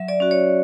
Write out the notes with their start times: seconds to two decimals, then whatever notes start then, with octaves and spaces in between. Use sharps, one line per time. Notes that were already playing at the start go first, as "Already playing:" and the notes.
Already playing: F#3 E5
0.08 D5
0.20 C#4 F#4
0.31 C#5